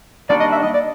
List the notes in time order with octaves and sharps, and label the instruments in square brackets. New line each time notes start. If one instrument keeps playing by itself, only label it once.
[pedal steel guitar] D#3 G3 A#3 D4 F#4 [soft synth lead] D5
[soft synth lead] D#5
E5
D#5
D5